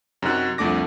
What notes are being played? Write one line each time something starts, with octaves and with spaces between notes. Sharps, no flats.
F#2 C3 D#4 F#4 F#6
C2 F2 A3 D4 D6 A#6